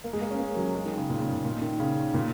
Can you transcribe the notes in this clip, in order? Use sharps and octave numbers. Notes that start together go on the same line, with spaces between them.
A#3
G#3
A#3
C#4
A#3
F#3
G#3
D#3
C#3
A#2
C#3
A#2
A#2
D#3
C#3
A#2